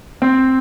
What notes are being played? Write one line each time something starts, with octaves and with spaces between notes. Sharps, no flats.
C4